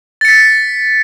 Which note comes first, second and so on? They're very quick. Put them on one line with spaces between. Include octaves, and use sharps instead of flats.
A6 C#7 B6